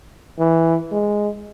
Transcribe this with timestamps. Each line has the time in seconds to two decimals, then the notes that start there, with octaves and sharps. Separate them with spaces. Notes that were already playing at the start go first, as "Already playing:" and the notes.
0.39 E3
0.92 G#3